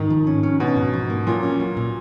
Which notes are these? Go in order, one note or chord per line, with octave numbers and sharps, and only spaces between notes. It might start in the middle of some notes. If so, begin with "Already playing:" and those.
Already playing: G#2 D#3
F3
C#4
C#4
B2 C#4
G#2
F3
A#3
A#2 F#3
C#4
F#3
A#2